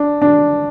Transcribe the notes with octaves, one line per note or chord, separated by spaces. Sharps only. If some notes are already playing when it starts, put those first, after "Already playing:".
Already playing: D4
D4